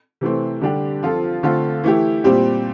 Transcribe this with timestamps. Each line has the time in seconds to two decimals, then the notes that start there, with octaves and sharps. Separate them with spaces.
0.21 C3 E3 A3 C4
0.61 D3 G3 D4 G4
1.03 F3 C4 F4 A4
1.43 D3 A3 C4 F4 A4
1.84 E3 A3 E4 G4
2.24 A#2 G3 C4 G4